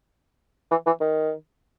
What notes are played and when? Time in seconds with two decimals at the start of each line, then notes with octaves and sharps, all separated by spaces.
0.71 E3
0.86 E3
1.01 D#3